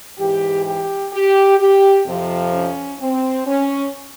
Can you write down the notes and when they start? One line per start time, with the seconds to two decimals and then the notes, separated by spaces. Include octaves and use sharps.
0.18 G#2 E3 G4
0.65 G4
1.12 G4
1.59 G4
2.06 F2 C3 F3
2.53 C#4
3.00 C4
3.46 C#4